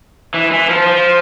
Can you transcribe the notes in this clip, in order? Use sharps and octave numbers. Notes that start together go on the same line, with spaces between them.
E3
E3
F3
F3